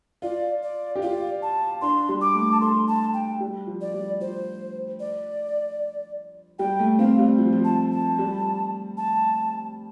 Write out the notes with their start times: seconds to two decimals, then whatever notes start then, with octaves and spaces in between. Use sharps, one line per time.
0.22 F4 D5
0.63 D5
0.96 G4
1.02 F4 D5
1.42 A5
1.82 D4 C6
2.09 G3
2.21 D6
2.35 A3
2.52 A5
2.61 A4 C6
2.87 A5
3.14 G5
3.40 G3
3.67 F3
3.81 D5
3.94 G3
4.20 F3 C5
5.00 D5
6.59 G3 G5
6.79 A3
6.99 C4 F5
7.19 G3
7.38 F3
7.53 F3
7.65 A5
7.91 A5
8.19 G3
8.97 A5